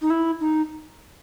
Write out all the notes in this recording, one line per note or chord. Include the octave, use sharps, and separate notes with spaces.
D#4
E4
D#4